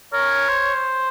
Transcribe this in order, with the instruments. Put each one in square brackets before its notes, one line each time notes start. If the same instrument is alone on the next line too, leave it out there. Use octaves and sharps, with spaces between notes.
[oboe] A#4 [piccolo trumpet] C#5
[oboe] C5